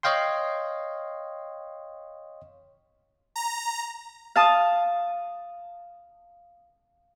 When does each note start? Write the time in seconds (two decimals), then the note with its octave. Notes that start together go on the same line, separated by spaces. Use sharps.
0.03 C#5 D#5 F5 G5 C6
3.36 A#5
4.36 F5 A5 D#6